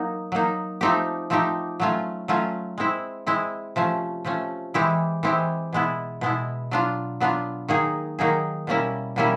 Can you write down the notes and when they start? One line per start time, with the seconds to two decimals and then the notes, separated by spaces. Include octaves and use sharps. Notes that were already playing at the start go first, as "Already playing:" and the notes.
Already playing: F#3 A#3 D#4
0.32 F#3 A#3 D#4
0.81 F3 A3 C4 D#4 G4
1.30 F3 A3 C4 D#4 G4
1.80 F#3 A3 C#4 F4
2.28 F#3 A3 C#4 F4
2.78 G#3 C4 E4
3.27 G#3 C4 E4
3.76 C3 F3 A3 C#4
4.25 C3 F3 A3 C#4
4.74 E3 G#3 C4 E4 G4
5.23 E3 G#3 C4 E4 G4
5.73 B2 G#3 B3 E4
6.21 B2 G#3 B3 E4
6.71 F#3 B3 D4 F4
7.20 F#3 B3 D4 F4
7.68 D#3 F#3 A#3 D#4 G#4
8.19 D#3 F#3 A#3 D#4 G#4
8.67 B2 G3 A#3 C#4 E4
9.16 B2 G3 A#3 C#4 E4